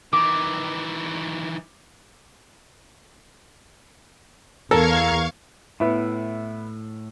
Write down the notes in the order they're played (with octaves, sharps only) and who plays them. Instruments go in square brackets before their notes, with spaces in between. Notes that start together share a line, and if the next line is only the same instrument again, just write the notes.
[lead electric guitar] D#3 E3 [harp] D6
[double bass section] E2 [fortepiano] A4 [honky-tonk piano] A#4 [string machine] F5 C#6 G#6
[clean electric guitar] A2 [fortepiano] B3 E4